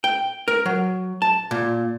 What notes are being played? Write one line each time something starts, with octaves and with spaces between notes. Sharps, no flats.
G5
A#4
F#3
A5
A#2